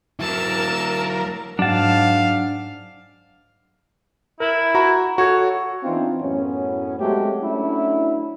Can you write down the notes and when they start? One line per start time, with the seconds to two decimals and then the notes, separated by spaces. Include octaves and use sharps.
0.20 F#3 E4 A#4 A5 E6
1.59 G#2 F#3 D4 F5 F#5 A5
4.40 E4 A#4
4.75 F#4 A#5 B5
5.18 F#4 A4 C#5
5.83 E3 B3 C4 D4 D#4 F4
6.20 F#2 A2 B3 C#4
6.99 F#3 G#3 A3 C4 F#4 G4
7.42 F#3 A3 C#4 D4 E4